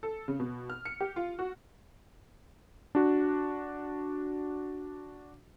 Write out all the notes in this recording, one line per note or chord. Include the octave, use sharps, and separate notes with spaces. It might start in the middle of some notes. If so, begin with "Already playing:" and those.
A4
C#3
B2
F6
C#7
G4
F4
F#4
D4 F#4